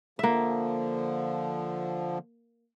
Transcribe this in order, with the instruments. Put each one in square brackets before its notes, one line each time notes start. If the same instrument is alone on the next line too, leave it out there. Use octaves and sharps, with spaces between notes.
[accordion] D3 F3 [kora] A#3 E5